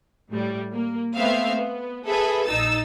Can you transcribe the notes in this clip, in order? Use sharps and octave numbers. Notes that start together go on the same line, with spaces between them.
A2 G3
A#3
A3 B3 C4 E5 F5
B3
G#4 A4 B4 E5
A#1 D#4 E6 A6